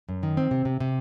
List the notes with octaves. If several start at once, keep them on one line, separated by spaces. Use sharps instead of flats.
F#2
D#3
C4
C3
C3
C3